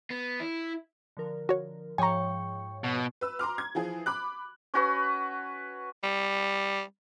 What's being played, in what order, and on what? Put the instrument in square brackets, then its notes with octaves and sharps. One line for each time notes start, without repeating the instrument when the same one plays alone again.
[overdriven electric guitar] B3
E4
[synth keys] D3 F3 A#4
[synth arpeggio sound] F#4 C#5
[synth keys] G#2 F3 C#5 [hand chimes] G5 C#6 [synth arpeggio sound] G#5 A#5
[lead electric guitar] B2
[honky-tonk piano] B4 E6
A#5 C6 D6 F6
G#6
E3 F3 G#4
B5 D6 F#6
[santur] C#4 F#4 B4
[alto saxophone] G3